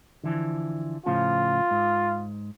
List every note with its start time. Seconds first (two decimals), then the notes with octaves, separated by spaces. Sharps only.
0.24 D3 E3 F3
1.06 A2 C#3 F3 F4
1.71 G#2